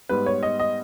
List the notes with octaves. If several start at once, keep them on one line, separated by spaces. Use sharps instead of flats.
G#2 G3 B3 B4
C#5
D#5
D#5